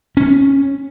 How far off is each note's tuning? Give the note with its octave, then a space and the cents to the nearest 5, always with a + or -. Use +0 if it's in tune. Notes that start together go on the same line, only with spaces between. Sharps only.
C#4 -10